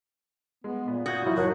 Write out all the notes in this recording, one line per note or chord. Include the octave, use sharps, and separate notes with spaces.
G#3 B3
A#2 B3
F#4 D#6 G6 G#6
F2 F#3 E4 F4
F#1 F#3 D#4 A#4 F#6